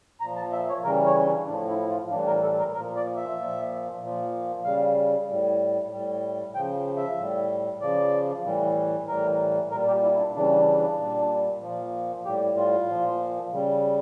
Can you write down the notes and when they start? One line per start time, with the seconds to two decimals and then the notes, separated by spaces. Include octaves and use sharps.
0.20 A#2 F3 A#5
0.36 A5
0.52 E5
0.69 C#5
0.84 C#3 E3 G3 A#4
1.06 C#5
1.15 C#4
1.26 D4
1.47 A2 F3 D4
1.68 E4
1.90 F4
2.10 A2 E3 G3 D4
2.27 A#4
2.42 A4
2.59 A#4
2.74 A#2 F3 A#4
2.96 D5
3.17 E5
3.38 A#2 F3
4.01 A#2 F3
4.65 C#3 G3 F5
5.27 A2 G3
5.91 A2 G3
6.55 C#3 F3 G5
6.97 E5
7.18 A2 G3
7.81 C#3 F3 D5
8.45 A2 E3 G3
9.08 A2 E3 G3 A#4
9.71 A#2 G3 A#4
9.87 G4
10.03 E4
10.19 D4
10.35 C#3 E3 G3 D4
10.56 D4
10.77 D4
10.98 A#2 G3
11.62 A#2 F3
12.25 A2 G3 G4
12.57 F4
12.89 A#2 F3
13.52 C#3 G3